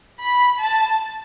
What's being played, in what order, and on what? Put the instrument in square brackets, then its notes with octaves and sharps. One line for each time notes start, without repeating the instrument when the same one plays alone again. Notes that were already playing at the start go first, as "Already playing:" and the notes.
[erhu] B5
A5